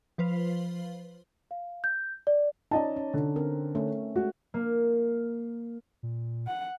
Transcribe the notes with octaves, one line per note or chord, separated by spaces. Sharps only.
F3 B4 C5 F5
F5
G6
D5
C#4 D#4 D5 D#5 A5
C#4
D3
C4 A#4
A3 C#4
G#3 A3 F#4
A#3
A#2
F#5